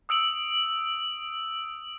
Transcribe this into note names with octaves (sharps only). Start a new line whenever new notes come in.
D#6 E6 D7 F#7